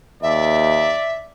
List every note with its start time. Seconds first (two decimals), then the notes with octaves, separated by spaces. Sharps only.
0.23 D#2 D5 E5